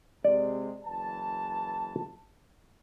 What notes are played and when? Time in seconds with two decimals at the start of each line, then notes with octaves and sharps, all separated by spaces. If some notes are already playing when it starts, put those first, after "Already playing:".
0.24 C3 G#3 D5
0.84 F#1 E3 A5